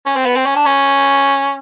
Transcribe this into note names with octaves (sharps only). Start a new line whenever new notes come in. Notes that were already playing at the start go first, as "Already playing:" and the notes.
C#4
C4
B3
C4
C#4
D4
C#4